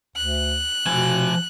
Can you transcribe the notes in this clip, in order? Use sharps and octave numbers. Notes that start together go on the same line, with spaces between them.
D2 F#6
B2 F3 C5 G#5